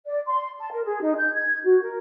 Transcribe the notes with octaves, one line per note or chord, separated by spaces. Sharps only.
D5
C6
A5
A#4
G#4
D#4
G6
G#6
F#4
A#4